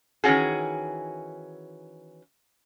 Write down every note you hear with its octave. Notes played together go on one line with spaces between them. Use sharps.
D#3 E3 C#4 F#4 G#4